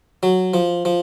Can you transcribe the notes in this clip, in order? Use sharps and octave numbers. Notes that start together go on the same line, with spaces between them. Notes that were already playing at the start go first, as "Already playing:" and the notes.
F#3
F3
F3